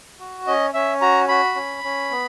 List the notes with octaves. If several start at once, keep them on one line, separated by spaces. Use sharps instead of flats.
F#4
C#4 D#5
C#4 E5
F#4 A#5
F#4 B5
C#4
C#4
B3